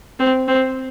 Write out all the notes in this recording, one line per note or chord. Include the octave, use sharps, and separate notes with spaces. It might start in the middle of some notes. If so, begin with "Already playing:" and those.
C4
C4